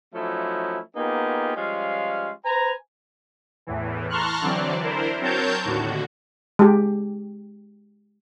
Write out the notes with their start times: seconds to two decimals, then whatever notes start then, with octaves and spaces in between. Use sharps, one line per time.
0.14 F3 F#3 A3 C#4 D#4 E4
0.97 A#3 B3 D#4 F4 G4 G#4
1.57 F3 G3 G#3 C#4 F4 F5
2.45 B4 C5 G#5 A#5
3.67 E2 A2 E3
4.10 A5 A#5 C6 C#6 F6 F#6
4.41 D3 E3 F#3 C4 D5
4.81 D4 E4 A#4 C5
5.21 F#3 C4 A#4 C#5 A5 G6
5.65 D#2 A2 D3 F#4
6.59 G#3 G4